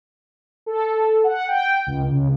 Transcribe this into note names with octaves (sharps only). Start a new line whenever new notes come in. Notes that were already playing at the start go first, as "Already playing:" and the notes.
A4
F#5
G5
C#2
C#2